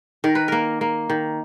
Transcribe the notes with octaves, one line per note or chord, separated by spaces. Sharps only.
D#3 A#4
B4
A#3 A#4
A#3
D#3